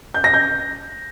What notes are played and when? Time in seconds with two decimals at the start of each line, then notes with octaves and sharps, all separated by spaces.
0.14 G6
0.24 A#6
0.34 G6